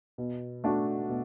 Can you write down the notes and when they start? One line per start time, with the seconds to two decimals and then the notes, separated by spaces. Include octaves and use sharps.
0.18 B2
0.64 A3 D4 F#4
1.09 B2